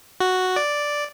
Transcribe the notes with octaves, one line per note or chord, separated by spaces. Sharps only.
F#4
D5